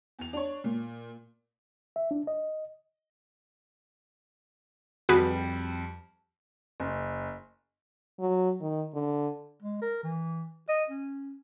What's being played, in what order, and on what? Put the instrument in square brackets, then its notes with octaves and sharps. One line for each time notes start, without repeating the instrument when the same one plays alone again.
[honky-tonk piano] E2 F7
D4 C#5
A#2
[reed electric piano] E5
D4
D#5
[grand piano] F2 G3 [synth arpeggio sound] F#4 G#4 B4
[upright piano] F#1
[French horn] F#3
D#3
D3
[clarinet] G#3
A#4
E3
D#5
C#4